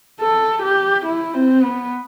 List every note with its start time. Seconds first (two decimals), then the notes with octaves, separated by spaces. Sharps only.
0.20 A4
0.63 G4
1.06 E4
1.34 C4
1.63 B3